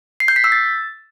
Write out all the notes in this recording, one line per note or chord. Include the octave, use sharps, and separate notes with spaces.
C7
G6
B6
E6
A6